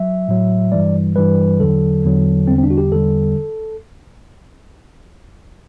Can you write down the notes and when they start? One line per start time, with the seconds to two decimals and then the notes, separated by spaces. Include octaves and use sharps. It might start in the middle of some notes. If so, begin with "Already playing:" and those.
Already playing: F#3 E5
0.28 A2 F#3
0.72 G2 E3 G3 D5
1.16 G2 E3 G3 B4
1.60 E2 D3 F#3 A4
2.04 E2 D3 F#3
2.47 E2 D3 G3 C4
2.58 C4
2.63 D4
2.70 F#4
2.78 G4
2.92 E2 D3 G3 A4